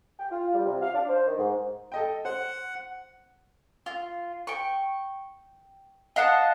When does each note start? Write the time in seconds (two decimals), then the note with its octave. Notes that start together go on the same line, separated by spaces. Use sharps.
0.19 G5
0.31 F4
0.53 G3
0.65 C3
0.81 F5
0.94 D4
1.08 C5
1.27 D#3
1.38 G#2
1.92 A4 D#5 G5
2.25 C5 F#5
3.86 F4
4.47 G5 C#6
6.16 D#5 F5 F#5 A5